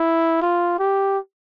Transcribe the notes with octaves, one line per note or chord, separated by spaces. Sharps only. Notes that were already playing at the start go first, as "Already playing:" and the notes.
Already playing: E4
F4
G4